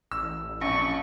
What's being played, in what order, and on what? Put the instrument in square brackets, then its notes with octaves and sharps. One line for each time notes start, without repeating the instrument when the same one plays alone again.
[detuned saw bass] A1 [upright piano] E6
[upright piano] A#1 F2 [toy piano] C#4 [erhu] C#6